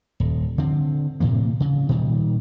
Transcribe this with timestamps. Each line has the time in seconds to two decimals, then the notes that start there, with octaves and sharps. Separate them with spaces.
0.20 D#1
0.58 D3 C4
1.20 A2 C3 E3 A#3
1.60 C#3
1.89 A#2 D#3 G3